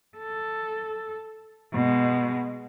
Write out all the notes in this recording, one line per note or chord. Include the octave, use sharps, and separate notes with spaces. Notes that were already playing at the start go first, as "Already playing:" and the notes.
A4
B2 G#3